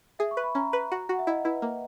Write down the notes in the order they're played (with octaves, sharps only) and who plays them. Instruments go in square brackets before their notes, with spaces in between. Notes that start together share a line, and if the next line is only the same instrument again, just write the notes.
[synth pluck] G#4 [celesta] E5
[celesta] C#6
[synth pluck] B4
[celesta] B5
[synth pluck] C#4 [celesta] A#5
[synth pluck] B4
F#4
[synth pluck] F#4 [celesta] F#5
[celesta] E5
[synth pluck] E4 [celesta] D#5
[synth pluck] E4 [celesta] B4
[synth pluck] A#3